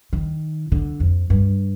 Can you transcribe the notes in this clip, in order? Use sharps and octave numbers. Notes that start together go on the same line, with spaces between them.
D#3
D3
F2
G2